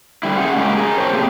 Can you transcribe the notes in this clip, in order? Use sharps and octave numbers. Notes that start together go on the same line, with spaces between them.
D3 G3 E4
C#4 G#4 F#5
C#3 F#3 G#3 A#3 G4
G#4 A#4
F#2 C5 C#5 G5 A5
A3 A#3 C4 G4 G#4